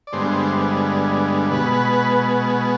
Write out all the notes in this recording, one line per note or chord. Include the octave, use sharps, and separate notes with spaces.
D5
G2 D3 G#3 B3 C5
B2 G#3 B3 B4